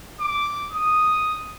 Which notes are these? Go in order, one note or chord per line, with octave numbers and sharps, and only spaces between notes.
D6
D#6